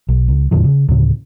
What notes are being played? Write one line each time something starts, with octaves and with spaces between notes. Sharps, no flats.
B1
C#2
E2 A2 D3 F3
C#3
D2 A2 C#3